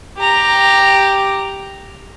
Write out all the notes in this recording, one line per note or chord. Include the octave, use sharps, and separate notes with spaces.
G4 A#5